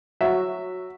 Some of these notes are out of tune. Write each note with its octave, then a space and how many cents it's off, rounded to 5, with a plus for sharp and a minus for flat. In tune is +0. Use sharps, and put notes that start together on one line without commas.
F#3 -15 F#4 +0 E5 +0